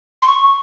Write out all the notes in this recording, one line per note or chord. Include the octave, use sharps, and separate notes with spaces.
C6
C#6